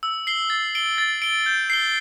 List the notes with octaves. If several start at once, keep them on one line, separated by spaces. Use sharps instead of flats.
E6
C7 G7
A6
D7 G7
A6
D7 G7
G6
C7 G7